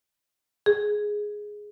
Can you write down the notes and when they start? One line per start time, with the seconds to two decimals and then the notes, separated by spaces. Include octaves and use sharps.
0.66 G#4